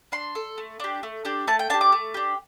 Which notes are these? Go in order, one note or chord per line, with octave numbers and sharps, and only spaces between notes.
D4 C6
A4
A3
D4 G4
A3
D4 G4
A3 A5
G5
D4 G4 A5
D6
A3
D4 G4